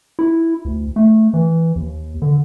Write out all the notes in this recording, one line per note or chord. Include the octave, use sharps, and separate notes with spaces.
E4
D2
A3
E3
D#2
D3